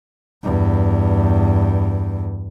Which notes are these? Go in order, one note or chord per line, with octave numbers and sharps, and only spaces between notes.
E2 G2